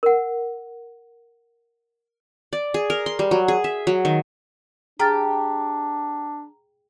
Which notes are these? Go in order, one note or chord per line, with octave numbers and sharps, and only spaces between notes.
A#4 F#5
D5
G#4
A#4
C6
G3
F#3
G#4
E5
F#3
D#3
D4 G4 G#4 A#5 F6 A6